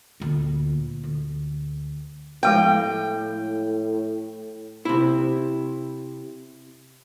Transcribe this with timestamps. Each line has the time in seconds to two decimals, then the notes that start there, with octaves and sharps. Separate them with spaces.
0.20 D2 A#2
1.03 D2
2.43 A2 F3 G#3 F5 G5
4.85 C3 E4